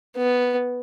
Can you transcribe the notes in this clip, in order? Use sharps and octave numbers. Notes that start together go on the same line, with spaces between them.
B3